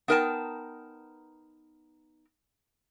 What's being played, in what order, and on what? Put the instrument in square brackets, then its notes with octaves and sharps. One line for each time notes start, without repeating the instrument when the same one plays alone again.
[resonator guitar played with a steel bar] B3 D#4 A#4 E5 G5 A5